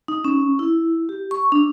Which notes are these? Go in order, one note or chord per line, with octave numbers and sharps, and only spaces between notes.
D#4
C#4
E4
G4
C#6
D4